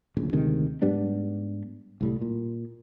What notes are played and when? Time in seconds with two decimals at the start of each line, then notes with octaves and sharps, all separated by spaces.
0.17 D1 A#1 C#3
0.33 D2 C3 D#3 G#3
0.82 G#2 G3 B3 D4
2.01 C2 A2 G3
2.21 A#2